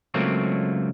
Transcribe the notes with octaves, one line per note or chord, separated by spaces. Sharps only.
C#2 F#3 A3 A#3 C4